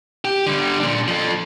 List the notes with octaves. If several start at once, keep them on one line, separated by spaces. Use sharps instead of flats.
G4
D3 G3
A#2 D4
F3 A4